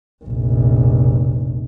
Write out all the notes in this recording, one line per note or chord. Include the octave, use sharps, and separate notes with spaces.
F1 A#1